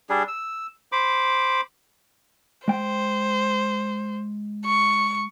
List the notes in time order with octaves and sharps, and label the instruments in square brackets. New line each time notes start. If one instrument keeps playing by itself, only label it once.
[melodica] G3 D4 G#4
E6
C5 B5 D6
[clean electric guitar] G#3 G5 [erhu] C5
[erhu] C#6